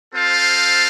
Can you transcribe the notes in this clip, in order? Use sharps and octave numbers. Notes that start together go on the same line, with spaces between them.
C4 F4 A4 C5 F5